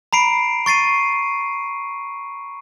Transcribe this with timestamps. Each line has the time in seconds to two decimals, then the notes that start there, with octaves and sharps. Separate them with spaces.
0.13 A#5 B5 C7 D7
0.66 C#6 A6 C7 D#7